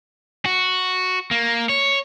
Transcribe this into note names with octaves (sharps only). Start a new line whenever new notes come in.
F#4
A#3
C#5